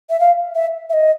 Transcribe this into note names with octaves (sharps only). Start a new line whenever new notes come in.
E5
F5
E5
E5
D#5